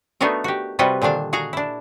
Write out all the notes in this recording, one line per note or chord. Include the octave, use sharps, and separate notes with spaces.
A3 B3 D4 D#4 F#4 A#4
F#4 G4
C3 G3 F4 F#4 B4 D#5
A#2 D3 D#3 D4 F5
F#4 G#4 F5 A#5
D4 E4